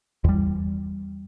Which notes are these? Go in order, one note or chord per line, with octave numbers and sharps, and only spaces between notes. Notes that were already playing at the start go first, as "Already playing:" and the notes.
E2 G3